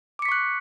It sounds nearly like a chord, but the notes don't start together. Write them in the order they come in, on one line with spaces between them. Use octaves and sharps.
D6 C#7 B6 C#6 F#6